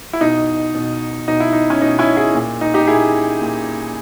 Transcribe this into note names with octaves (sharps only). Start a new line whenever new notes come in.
E4
B2 D#4
B2
B2 D#4
E4
D#4
C#4
B2 D#4
C#4 E4
E4 G#4
A#2
D#4
D#4 G4
A#2 E4 G#4
A#2